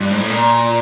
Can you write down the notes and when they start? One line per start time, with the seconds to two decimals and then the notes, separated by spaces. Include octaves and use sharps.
0.01 G2
0.11 G#2
0.20 A2
0.30 A#2